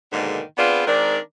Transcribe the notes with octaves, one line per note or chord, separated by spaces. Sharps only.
G#2 B2 D3 D#3 G#3 A#3
B3 C4 D4 F4 G#4 B4
D#3 G#3 C4 D4 A#4 D5